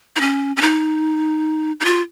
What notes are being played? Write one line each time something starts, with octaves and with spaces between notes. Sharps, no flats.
D#4
C#4
C#4
D#4
D#4
F4